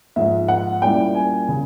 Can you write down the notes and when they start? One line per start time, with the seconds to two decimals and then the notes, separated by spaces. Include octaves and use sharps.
0.16 G#2 F3 G#3 E5
0.48 F#5
0.82 A#2 G3 A#3 C#4 E4 G5
1.15 G#5
1.48 C#3